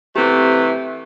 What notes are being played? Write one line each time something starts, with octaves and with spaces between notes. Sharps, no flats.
C3 E3 A3 C4 G4